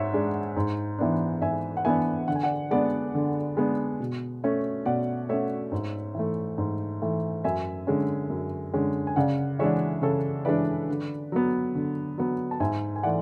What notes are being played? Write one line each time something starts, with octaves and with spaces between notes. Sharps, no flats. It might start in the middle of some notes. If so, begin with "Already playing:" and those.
Already playing: G#2 C#5 E5 F#5
G#3 D4
G#2
E3 B3 D4
G#2 E5 G#5
F#5
E3 B3 D4 E5 G#5
D3 F#5
G#5
D5 F#5
G#3 B3 D4 D5 F#5
D3
G#3 B3 D4
B2
A3 C#4
B2 D5 F#5
A3 C#4 C#5 E5
G#2
E3 A3
G#2
E3 A3
F#2 E5 G#5
D3 G#3 C#4
F#2
D3 G#3 C#4
G#5
C#3 D5 F#5
E3 G#3 D4 C#5 E5
C#3 A4 C#5
E3 G#3 D4 B4 D5
D3
F#3 B3
D3
F#3 B3
A5
G#2 E5 G#5
G#5
E3 A3 D5 F#5